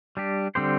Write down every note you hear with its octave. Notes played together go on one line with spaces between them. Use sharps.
G3 D4 G4
D3 G3 C4 G4 C5